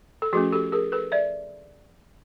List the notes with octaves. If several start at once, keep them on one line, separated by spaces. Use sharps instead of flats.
A4
F3 A3 C#4 F#4 G#4
G4 A4
G#4 A#4
A4 B4
D5 E5